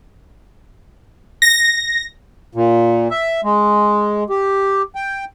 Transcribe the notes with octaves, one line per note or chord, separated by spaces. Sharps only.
A#6
A#2
E5
G#3
G4
G5